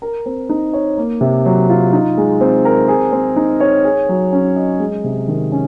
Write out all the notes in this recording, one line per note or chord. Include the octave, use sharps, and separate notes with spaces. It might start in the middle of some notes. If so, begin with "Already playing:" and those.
A#4
C4
D#4
C#5
A#3
C3
F#3
F4
D#4
G#3
C4
A#4
G#4
C4
D#4
C#5
G#4
F#3
C#4
D#5
G#3
C3
D#3
C#4